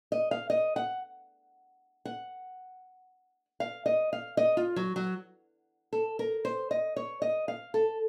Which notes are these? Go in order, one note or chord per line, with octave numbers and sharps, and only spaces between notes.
D#5
F5
D#5
F#5
F#5
F5
D#5
F5
D#5
F4
F#3
F#3
A4
A#4
C5
D#5
C#5
D#5
F5
A4